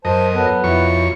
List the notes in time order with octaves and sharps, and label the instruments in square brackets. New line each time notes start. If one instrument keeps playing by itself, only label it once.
[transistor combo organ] F#2 A#4 D#5 [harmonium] C5 A5
[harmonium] F#3 A4 [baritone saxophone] B3
[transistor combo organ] F2 C#5 C#6 [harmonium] B2 E4 A#5